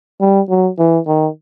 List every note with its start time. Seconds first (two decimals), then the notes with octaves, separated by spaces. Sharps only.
0.21 G3
0.50 F#3
0.79 E3
1.07 D#3